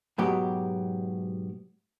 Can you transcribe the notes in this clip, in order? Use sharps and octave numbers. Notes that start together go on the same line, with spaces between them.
G#2 B2 F#3 B3 G4